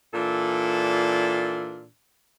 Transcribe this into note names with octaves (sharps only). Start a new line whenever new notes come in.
A#2 E3 D4 A4